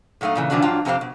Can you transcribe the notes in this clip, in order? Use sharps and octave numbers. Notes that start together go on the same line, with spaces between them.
A#2 F#3 A3 D#4 F5
A#2 C#3 E3
C3 D#3 E3 F#3 A3 D4
G#2 F3 F#3 D4 F4 G5
F2 C3 G#3 C4 G4 F5
B2